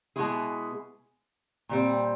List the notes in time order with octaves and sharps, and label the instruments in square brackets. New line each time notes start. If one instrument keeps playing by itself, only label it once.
[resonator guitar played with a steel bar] B2 G#3 B3 E4 G#4
A#2 G3 C4